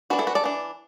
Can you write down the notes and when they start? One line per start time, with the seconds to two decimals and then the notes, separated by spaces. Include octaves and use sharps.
0.10 E3 D4 F#4 B4
0.19 E4 A4
0.27 F#4 B4
0.35 A4 D5
0.44 E3 D4